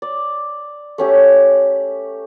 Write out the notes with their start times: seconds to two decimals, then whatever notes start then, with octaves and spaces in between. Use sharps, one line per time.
0.02 D5
0.98 A3 C#4 G4